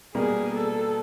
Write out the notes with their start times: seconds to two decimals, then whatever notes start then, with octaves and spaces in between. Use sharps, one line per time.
0.15 B2 G3 A#3 G#4
0.55 A4